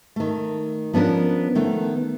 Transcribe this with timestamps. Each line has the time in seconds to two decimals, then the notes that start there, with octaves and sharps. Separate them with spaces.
0.16 D#3 A3
0.93 F3 B3 C#4 D4 A#4
1.55 D#3 A3 B3